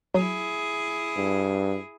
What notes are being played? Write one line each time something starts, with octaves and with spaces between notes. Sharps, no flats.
F#3 E4 G#4
G2